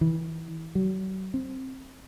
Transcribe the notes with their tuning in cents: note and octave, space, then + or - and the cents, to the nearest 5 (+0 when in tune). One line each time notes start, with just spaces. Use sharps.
E3 -25
F#3 +40
C4 +10